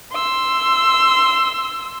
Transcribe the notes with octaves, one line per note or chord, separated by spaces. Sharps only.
C6 E6